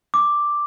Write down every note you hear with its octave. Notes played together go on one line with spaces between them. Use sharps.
D6